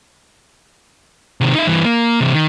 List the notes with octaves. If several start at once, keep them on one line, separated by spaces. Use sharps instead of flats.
C3 D#3
D#4 E5
G2 E3
A#3
C3 E3
D#3